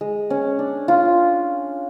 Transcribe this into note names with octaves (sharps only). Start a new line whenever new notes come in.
G#3
C#4
D4
F4